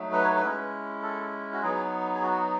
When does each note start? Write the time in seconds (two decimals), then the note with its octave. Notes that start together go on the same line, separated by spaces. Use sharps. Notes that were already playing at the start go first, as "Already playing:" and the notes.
Already playing: F#3 A3 D#4
0.12 B4
0.24 C#5
0.36 B4
0.43 G#3 C#4 E4
1.02 A4
1.53 F#4
1.63 F#3 B3 D#4 G#4
2.15 G#4
2.23 F#4